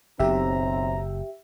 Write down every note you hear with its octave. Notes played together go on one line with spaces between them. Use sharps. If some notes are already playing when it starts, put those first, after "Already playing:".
F#1 B1 C4 G4 E5 A#5